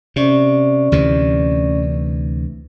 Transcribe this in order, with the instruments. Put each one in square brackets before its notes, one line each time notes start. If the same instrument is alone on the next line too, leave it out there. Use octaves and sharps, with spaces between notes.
[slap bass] C3 [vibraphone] C#4 D5 C#6
[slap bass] D2 C3 E3